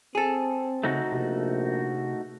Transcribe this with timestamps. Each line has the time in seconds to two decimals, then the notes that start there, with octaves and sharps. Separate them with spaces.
0.15 C4 G#4 A4
0.84 C#3 A3 D#4 F#4
1.12 A#1 C3